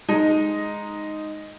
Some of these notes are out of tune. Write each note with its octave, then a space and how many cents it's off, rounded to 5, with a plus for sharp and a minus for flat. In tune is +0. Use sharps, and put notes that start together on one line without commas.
G#3 +0 D#4 +0